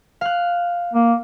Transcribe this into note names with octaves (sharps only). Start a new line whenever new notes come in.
F5 F#6
A#3